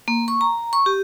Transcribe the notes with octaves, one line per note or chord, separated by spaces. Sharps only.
A#3
C#6
A#5
C#6
G4